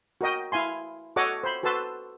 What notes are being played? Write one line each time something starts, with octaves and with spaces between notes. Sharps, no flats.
F#4 A#4 D#5 G5
E4 F5 G#5 C6
F#4 A4 C#5 D#5 F#5 D6
C5 B5
F#4 A4 B4 A5 C6 E6